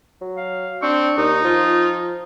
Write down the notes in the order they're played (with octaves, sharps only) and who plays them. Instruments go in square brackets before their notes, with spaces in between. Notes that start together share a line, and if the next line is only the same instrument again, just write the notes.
[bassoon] F#3
[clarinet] F5
[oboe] C4 [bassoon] D4 [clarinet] C#6
[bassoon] D#2 [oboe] D#4
[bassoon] F3 [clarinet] F4